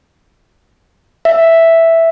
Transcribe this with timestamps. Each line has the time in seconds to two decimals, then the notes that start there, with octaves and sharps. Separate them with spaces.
1.25 E5